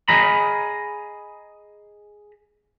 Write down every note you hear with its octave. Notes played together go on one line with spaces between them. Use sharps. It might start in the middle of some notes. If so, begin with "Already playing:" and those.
G#4 D#5 A#5 B5